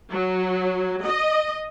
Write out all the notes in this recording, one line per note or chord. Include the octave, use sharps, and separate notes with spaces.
F#3
D#5